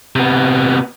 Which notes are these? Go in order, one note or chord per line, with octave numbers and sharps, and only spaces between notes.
C3 B3